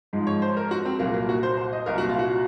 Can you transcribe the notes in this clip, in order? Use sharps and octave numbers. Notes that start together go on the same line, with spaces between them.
G#2 F3 G#3
C#5
C5
A#4
F#4
C4
C2 A#2 F#3 A#3
A#3
F#4
C5
C5
D#5
C2 A#2 F#3 A#4
F#4
F4
F#4